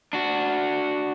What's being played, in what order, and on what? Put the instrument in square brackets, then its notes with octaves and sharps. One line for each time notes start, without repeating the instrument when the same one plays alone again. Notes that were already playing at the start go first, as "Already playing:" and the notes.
[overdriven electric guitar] D4 F#4